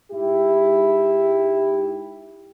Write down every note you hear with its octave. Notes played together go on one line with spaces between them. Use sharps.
G#2 E4 G4